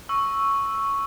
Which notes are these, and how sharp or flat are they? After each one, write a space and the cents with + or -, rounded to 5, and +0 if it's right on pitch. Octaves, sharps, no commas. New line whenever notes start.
C#6 +0 E6 +0